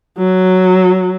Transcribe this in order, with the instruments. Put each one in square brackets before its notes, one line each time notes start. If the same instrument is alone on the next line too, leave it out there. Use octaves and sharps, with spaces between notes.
[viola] F#3